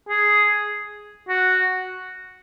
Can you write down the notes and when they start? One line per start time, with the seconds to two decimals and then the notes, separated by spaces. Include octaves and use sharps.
0.09 G#4
1.29 F#4